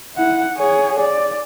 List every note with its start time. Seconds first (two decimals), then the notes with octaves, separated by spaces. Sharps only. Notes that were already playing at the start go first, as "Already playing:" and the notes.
0.16 E4 F#5
0.56 G#4 C#5
0.99 D5